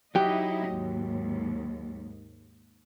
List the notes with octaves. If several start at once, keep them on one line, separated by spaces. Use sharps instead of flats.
F#3 D#4 E4 G4 D#5
D#2 G#2